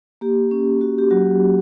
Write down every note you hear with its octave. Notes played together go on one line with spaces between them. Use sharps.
A#3 G4
C#4
F#4
G4
F#3 F#4